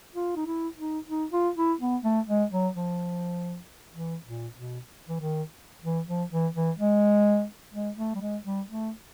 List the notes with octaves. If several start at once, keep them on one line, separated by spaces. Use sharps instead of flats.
F4
D#4
E4
D#4
D#4
F4
E4
B3
A3
G#3
F#3
F3
E3
A#2
B2
E3
D#3
E3
F3
E3
E3
G#3
G#3
A3
G3
G#3
G3
A3